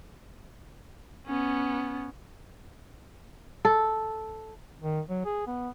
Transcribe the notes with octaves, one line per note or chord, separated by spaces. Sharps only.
B3 C#4
A4
D#3
F#3
G#4
B3